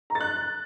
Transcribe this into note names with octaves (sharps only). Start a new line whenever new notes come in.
A#5
A6
F#6